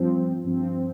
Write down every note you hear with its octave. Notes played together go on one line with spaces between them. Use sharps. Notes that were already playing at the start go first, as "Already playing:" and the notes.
Already playing: G2 F3 C4
G2 F3 C4